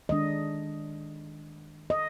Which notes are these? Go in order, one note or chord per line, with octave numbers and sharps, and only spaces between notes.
D#3 G#3 D4 D#5
D#5